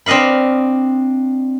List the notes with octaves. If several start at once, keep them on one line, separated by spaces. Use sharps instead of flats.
C4 D4 D#5 F5 B5